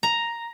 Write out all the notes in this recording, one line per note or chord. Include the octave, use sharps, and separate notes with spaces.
A#5